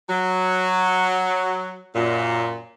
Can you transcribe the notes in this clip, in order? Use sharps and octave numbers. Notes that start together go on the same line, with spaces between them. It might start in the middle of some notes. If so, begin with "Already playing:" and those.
F#3
F#2 A#2